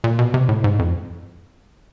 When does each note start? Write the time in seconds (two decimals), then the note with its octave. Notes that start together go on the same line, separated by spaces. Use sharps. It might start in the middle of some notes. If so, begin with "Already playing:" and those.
0.04 A#2
0.19 B2
0.34 C3
0.49 A2
0.64 G#2
0.79 F2